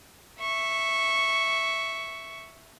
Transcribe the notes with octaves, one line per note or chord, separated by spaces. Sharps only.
E5 C#6